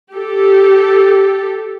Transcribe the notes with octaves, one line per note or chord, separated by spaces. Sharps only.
G4 A4